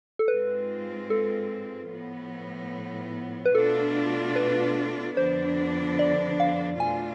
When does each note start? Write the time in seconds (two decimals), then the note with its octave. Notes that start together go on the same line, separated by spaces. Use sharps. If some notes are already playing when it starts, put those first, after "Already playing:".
0.19 A4
0.28 G#2 G#3 C4 F4 B4
1.10 A4
1.91 A2 F3 B3
3.45 B4
3.54 B2 A3 D4 F4 A4
4.36 B4
5.17 F2 D3 F3 B3 D4 C5
5.99 D5
6.40 F5
6.80 B2 A3 D4 F4 G#5